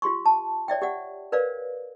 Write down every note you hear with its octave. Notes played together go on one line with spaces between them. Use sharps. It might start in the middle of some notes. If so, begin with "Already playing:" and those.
F4 G4 C6 C#6
A5
C#5 D5 E5 G5
G4 D5 F#5
A#4 B4 C#5 D5 F5